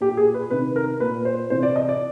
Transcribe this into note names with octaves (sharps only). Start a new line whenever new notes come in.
A#2 G4
G#4
B4
C3 D#3 B4
A#4
A#2 B4
C5
C3 E3 C5
D5
D#5
D5